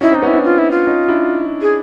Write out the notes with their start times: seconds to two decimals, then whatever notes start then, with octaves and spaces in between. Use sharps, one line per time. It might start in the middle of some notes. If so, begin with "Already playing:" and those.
0.01 C#4 D#4 E4
0.12 C4 D4 D#4
0.22 B3 C#4
0.27 E4
0.33 C4 D4
0.45 F4
0.58 E4
0.71 F4
0.87 C#4 D#4
1.08 D4 E4
1.62 G#4